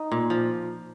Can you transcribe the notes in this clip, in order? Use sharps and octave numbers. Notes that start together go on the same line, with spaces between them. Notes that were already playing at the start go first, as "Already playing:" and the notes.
Already playing: D#4
A#2
F3